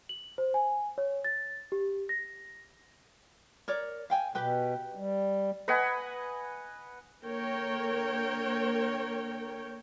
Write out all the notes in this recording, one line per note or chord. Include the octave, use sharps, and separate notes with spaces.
F#7
C5
G#5
C#5
A6
G4
A#6
A#4 C#5 D5
F5 G5 G#5
B2 G4 B4 G5
G3
B4 D#5 F#5 G#5
D3 A#3 A#4 C#5 G5